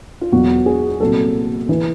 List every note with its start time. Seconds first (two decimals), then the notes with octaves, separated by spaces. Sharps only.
0.21 F4
0.32 E1 E2 B2 F#3 F#4
0.66 G#4
1.00 C2 A#2 F#3 A4
1.69 E3 B4